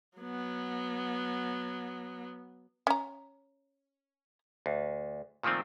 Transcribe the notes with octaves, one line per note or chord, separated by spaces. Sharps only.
F#3 B3
C#4 A#5
D2
A#2 D#3 F3 A3 C4